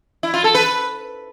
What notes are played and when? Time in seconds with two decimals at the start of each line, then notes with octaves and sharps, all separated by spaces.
0.23 E4
0.34 F4
0.44 A4
0.55 B4